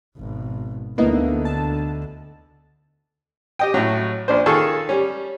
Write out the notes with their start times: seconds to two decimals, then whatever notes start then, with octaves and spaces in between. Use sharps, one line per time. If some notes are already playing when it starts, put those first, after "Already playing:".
0.17 G#1 B2
0.98 D2 D3 A#3 B3 D#4 E4
1.45 A5
3.59 G4 D#5 G5
3.74 A2 F#3
4.28 A#1 D4 C5
4.46 D#3 F4 G#4 A4 A5 C#6
4.89 G3 C#4